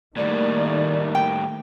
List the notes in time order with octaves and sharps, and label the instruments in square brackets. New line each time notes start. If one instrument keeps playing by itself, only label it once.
[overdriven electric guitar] A2 G3 [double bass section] D#3 A3 A#3 [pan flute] D5
[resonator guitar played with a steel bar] G5